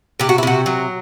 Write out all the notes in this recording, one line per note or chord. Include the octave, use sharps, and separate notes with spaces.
C3 G4
F#4
E4
C3 F#4
F#3